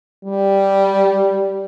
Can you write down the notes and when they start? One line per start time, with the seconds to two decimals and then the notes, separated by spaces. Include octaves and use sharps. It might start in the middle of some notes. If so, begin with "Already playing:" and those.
0.25 G3